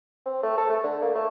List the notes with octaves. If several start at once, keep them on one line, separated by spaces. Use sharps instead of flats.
C4
A3
A4
A3
D3
A#3
A3